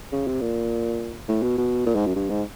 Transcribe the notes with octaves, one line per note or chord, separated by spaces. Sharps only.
C#3
C3
A#2
A2
B2
B2
A#2
G#2
F#2
G2
G#2